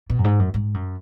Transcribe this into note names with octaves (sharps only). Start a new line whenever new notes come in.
B2
F#2
G#2
F#2
G#2
F#2